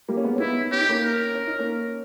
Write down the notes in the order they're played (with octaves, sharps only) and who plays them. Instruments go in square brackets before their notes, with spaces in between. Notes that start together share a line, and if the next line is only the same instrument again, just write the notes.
[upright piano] G3 A#3
C#4
G#3 B3
C#4
[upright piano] B3 D#4 [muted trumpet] E4
[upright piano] C#4 [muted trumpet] G4
[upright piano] D#4
A#3 C#4
[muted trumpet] A#4
[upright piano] C#4
D#4
A#3 C#4